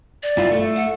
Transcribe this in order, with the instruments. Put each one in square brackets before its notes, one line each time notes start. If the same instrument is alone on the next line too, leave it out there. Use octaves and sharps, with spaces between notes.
[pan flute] D5
[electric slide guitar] G2 E4 F4
A3
[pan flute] F#5